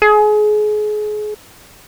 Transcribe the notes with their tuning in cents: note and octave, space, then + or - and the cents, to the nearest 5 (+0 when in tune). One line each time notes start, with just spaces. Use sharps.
G#4 +30